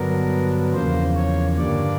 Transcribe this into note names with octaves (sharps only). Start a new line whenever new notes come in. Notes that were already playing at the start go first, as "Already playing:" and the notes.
Already playing: G2 D3 F#3 B3 D4 A#4
E2 C#3 F3 A#3 C5
C#5
G2 D3 G3 A#3 D4 D5